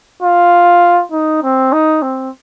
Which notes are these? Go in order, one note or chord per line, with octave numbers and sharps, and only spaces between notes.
F4
D#4
C4
D#4
C4